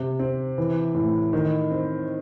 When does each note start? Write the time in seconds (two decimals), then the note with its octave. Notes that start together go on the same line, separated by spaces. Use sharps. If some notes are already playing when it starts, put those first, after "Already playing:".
Already playing: C3
0.19 C4
0.58 E3
0.95 A2
1.33 D#3
1.71 C4